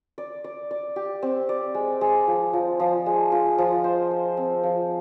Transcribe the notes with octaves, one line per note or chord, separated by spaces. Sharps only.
D5
D5
D5
G4
C4
D5
G#3
G#3
F3
F3
F3
G#3
F4
F3
C5
C5
C4
F3